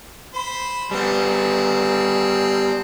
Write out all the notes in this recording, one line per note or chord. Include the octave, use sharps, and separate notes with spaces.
C5 B5
G3 B3 C4 G#4